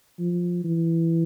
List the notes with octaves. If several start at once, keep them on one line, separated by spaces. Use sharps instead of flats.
F3
E3